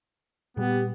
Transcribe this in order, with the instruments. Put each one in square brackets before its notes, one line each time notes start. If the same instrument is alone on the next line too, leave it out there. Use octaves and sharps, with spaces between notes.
[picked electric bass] A#2 G3 [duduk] B3 [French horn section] G4